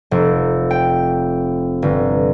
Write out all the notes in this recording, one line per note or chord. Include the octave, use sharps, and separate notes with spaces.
F1
G5
G1